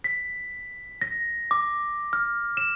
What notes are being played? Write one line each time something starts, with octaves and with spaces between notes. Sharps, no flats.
B6
A#6
D6
F6
E7